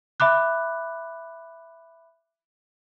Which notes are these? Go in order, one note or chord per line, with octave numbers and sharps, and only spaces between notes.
E5 B5 D6 F#6